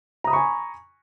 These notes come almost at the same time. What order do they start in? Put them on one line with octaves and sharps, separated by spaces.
A#5 D#6 B5 C#6 G#5